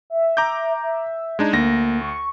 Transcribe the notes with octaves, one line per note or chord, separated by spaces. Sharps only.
E5
A#5 D6 G6
E5
G#3 D4 D#4 G#6
D2 A#3 A#6
C#6